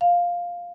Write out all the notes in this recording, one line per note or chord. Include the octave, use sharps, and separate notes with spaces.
F5